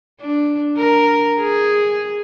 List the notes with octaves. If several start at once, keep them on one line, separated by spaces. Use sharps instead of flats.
D4
A#4
G#4